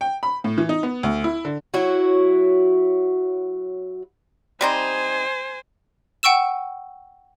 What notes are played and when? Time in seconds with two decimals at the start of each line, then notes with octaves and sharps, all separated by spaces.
0.01 G5
0.23 B5
0.44 A2
0.58 E3
0.69 D#4
0.83 B3
1.03 D2
1.24 E4
1.45 D3
1.74 F#3 E4 F#4
4.61 G3 C4 D#4 C5 G#5
6.23 F#5 G5 C#6 E6 E7